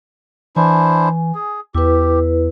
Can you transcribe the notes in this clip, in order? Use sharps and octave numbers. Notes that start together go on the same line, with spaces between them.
E3 D4 E4 C5 G#5
G#4
E2 E4 G4 B4